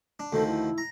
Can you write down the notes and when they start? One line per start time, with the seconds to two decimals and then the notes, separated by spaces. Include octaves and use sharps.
0.20 D4
0.33 D2 D#3 F3 A4
0.48 E4
0.78 A#5